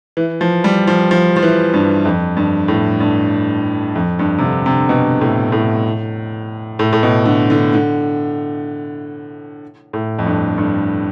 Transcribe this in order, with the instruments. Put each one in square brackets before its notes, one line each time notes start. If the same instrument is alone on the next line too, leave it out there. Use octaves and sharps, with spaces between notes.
[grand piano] E3
F3
G3
F3
F3
F3
E3
G2
F2
G2
A2
G2
F2
G2
C3
D3
C3
B2
A2
A2
A2
A2
B2
D3
D3
D3
A2
F2
G2
G2